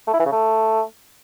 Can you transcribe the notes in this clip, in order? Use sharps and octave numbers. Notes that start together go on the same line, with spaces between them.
A3
E4
E3
C#3
A3